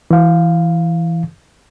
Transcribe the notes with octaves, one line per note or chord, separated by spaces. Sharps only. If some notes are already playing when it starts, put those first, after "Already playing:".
E3 F5